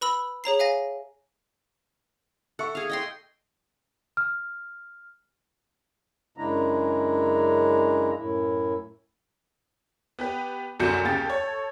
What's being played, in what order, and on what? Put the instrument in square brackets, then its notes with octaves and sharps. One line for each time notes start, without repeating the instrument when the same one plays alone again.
[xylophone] B4 B5 E6 F#7
G#4 C#5 A#5 C7
E5 F5 G#5 A#6
[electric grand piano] A4 E5 C#6 [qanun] F#5
[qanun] G#4 F5
D#5 G5 C6
[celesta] F6
[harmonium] F#2 C#3 G#3 D4 E4 A#5
F#2 A2 E4
[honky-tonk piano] B3 G4 B4
C2 F#2 D3 F#4 G6 C#7
D#2 C#3 G4 G5 A6
A4 C#5